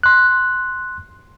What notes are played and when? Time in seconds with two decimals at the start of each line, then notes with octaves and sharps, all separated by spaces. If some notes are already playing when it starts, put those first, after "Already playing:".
0.03 C6 F#6